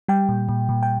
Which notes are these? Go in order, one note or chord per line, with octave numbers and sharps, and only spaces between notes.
G3 G5
A#2
A#2
A#2
G5